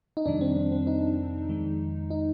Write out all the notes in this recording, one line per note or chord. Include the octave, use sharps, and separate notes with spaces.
D#4
F2 C3 D#3 G3 D4
C4
C4
C4
D#4
F2 D#3 G#3
D#4